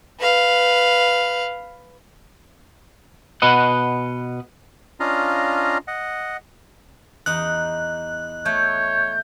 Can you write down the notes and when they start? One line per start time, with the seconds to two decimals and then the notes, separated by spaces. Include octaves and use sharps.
0.20 B4 F5
3.42 B2 B4 D#5 F#5
5.00 C#4 D4 F4 D#5 F5 A#5
5.88 D#5 F#5
7.26 E2 D#4 F#6
8.46 A3 C#5 G6